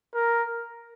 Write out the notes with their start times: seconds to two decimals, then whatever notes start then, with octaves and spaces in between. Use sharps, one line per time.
0.14 A#4